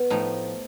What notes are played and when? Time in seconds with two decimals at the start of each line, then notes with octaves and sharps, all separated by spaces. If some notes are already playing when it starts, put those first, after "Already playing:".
Already playing: B3
0.10 A2 F3 D#4